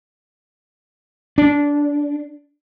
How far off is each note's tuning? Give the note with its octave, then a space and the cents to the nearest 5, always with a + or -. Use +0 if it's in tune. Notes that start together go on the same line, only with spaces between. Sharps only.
D4 -15